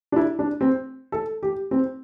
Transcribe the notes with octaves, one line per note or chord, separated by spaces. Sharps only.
D4
E4
D4
C4
A4
G4
C4